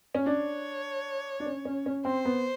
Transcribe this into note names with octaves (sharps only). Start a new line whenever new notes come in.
C#4
D4 C#5
D4
C#4
C#4
C#4
C4 C5
B3